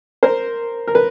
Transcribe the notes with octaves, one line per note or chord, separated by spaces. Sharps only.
A#4 C5
A#4
B4